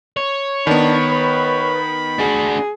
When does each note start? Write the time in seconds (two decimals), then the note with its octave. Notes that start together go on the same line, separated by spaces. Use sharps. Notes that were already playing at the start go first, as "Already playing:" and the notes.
0.17 C#5
0.67 D#3 B3 D4 B5
1.12 B4
2.19 D4 F#4 G#4